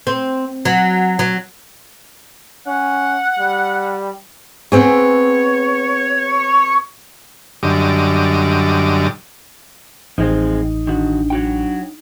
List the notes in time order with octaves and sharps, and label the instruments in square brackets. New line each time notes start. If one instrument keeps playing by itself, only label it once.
[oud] C4
F#3
F#3
[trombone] C#4 [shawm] F#5
[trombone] G3
[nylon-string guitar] B3 C4 G#4 [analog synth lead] C#5
[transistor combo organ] F#2 D3 G3 D#5 D6
[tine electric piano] A1 [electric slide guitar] F3 G#3 C4 [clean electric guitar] D#4
[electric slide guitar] D#3 F#4 [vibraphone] D4
[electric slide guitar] F#3 F#4 G5